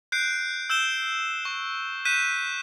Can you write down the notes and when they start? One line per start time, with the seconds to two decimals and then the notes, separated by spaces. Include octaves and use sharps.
0.12 F#6 G6 C7 D7
0.70 E6 G6 E7 G7
1.45 C#6
2.05 F#6 G6 B6 D#7 E7